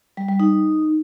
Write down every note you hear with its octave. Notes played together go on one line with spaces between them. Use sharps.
G3
G3
D#4